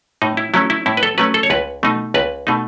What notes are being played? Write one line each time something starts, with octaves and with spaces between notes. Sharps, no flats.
A2 D#4
E4
F#3 A3 C#4 E4
E4
A2 E4
B4
A4
F#3 A3 C#4 B4
A4
C#5
C#2 B4
B2 A3 D#4
C#2 B4
B2 A3 D#4